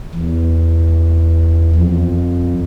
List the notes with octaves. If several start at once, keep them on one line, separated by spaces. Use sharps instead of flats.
E2
F2